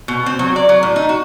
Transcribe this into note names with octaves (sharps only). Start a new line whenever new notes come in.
B2
C4
F#3
D5
F#3
A2
D#4
F#4